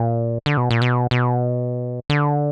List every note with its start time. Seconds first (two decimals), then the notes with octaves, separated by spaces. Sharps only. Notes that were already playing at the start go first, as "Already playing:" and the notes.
Already playing: A#2
0.46 D3
0.57 B2
0.71 A#2
0.82 B2
1.11 B2
2.10 D3